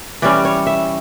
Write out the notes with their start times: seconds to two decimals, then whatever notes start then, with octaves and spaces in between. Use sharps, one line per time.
0.22 E3 G3 C#4 D5
0.45 C#5
0.67 E5